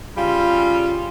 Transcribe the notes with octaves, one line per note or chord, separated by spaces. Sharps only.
C#3 G3 F4